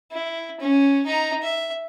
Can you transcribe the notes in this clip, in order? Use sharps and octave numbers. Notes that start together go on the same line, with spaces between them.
E4
C#4
D#4 A#5
E5